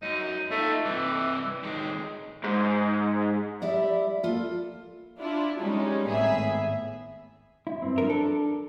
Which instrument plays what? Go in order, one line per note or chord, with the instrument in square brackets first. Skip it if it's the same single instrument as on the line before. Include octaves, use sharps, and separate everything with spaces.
[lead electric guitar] F#2 [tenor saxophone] D#4
[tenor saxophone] A3 [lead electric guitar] D#4 F4
[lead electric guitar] G2 C3 [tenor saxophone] E3
[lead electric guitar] A2 D#3 [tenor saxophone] G#3
[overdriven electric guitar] G#2
[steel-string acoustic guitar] G3 E4 D5 [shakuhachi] E5
[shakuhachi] A#3 [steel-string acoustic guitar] F4 A4
[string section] D4 E4 F4
G3 G#3 C#4 D#4
G#1 A2 B3 G#4 E5
[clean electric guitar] E4
G2 C4
[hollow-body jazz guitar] F3 A#4 [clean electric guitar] D4
[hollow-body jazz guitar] A4